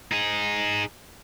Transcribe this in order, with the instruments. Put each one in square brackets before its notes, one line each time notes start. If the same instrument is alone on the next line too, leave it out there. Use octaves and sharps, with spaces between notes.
[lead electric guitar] D#4 G#4